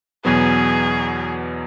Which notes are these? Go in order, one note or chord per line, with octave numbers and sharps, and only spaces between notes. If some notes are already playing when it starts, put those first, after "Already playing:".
E2 B2 F#3 B3 G#4